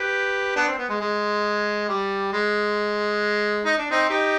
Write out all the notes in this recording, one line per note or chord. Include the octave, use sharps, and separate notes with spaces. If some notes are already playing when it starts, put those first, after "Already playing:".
Already playing: G4 B4
B3 D4
C4
B3
G#3
G#3
G3
G#3
D#4
D4
C4 D#4
D#4 G4